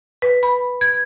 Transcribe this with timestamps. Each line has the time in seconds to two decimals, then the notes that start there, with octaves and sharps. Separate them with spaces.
0.22 B4
0.43 B5
0.81 G#6